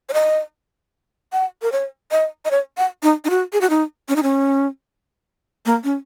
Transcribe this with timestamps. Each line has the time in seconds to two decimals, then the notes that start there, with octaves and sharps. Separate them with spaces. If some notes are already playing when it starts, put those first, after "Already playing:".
0.09 C#5
0.14 D#5
1.33 F#5
1.62 A#4
1.72 C#5
2.11 D#5
2.45 D#5
2.51 C#5
2.77 F#5
3.03 D#4
3.25 D#4
3.30 F#4
3.53 G#4
3.61 F#4
3.70 D#4
4.09 C#4
4.16 D#4
4.23 C#4
5.66 A#3
5.84 C#4